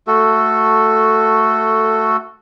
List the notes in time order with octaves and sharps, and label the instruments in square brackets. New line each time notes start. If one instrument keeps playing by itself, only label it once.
[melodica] A3 F#4 A4